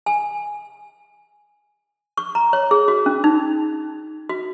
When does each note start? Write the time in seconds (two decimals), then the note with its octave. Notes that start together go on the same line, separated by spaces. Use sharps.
0.06 G#5
2.18 C#6
2.35 A#5
2.53 C#5
2.71 G#4
2.88 F#4
3.06 C#4
3.24 D#4
4.29 F#4